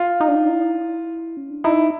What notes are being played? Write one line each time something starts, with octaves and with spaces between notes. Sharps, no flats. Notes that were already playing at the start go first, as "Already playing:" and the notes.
Already playing: F4
D#4
D4
D#4
E4
C#4
D4
D#4 E4